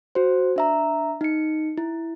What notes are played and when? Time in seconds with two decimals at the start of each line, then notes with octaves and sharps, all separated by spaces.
0.15 F#4 C5
0.56 D4 E5 A#5
1.21 D#4 C#7
1.78 E4